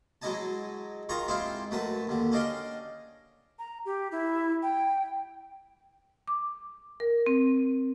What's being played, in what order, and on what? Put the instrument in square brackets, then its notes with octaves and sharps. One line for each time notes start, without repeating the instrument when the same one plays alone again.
[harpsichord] F#3 G#3 E4 D#5 G#5 A5
D#3 F4 G#4 A#5 C#6
G#3 C4 E4 F4 G4 F5
F#2 F#3 A3 B4 A5
D#2 D3
C#4 D4 D#5 F5 G5
[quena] A#5
G4
E4
G5
[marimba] D6
A#4
C4